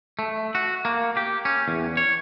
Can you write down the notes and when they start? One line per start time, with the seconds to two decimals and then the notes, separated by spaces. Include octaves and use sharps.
0.19 A3
0.55 F#4
0.85 A#3
1.17 G4
1.45 C#4
1.68 E2
1.97 C#5